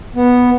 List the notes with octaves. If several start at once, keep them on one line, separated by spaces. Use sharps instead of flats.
B3